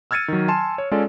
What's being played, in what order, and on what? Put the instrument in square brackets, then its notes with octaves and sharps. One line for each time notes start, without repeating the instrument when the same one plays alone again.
[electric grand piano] E6 F6 G#6 A6 C#7 D#7
D#3 F#3
G#5 A5 C6 E7
C#5
G#3 C#4 F4 A4 D5